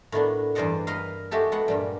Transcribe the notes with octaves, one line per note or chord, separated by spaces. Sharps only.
A2 D#3 B3 D4
E2 G2 C5 D5 D#5 F#5
A#4 B4 D#5 F5
G#3 A3 F#4 G4 A4
G#3 B3 F#5
G2 A#2 G3